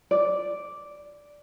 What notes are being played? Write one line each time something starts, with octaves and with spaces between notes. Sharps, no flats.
D5